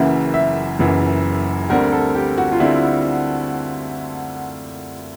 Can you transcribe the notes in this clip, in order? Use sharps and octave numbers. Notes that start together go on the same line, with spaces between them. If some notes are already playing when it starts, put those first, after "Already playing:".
Already playing: F#1 F#2 C#3 E3 E5
E5
F#1 F#2 C#3 E3
D2 D3 G3 C4 A#4
A4
G4
F#4
F4
D3 G3 C4 E4